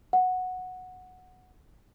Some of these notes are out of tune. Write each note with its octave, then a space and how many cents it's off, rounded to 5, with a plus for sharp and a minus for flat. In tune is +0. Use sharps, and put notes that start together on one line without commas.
F#5 -10